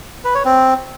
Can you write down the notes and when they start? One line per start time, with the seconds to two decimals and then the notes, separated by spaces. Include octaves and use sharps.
0.24 B4
0.35 C#5
0.45 C4